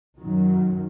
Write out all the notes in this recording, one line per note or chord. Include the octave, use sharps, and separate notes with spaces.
F#2 D#3 F#3